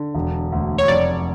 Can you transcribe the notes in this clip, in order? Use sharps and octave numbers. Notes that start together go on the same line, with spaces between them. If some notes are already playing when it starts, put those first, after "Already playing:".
Already playing: D3
E1
D2
C#5
F1 D5